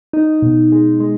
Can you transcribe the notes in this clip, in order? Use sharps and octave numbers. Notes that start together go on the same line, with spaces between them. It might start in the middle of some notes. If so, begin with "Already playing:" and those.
D#4
B2
G#3
G#3